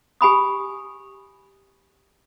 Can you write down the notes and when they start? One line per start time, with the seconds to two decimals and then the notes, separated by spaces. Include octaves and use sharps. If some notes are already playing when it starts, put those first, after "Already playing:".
0.21 G4 G#5 B5 D#6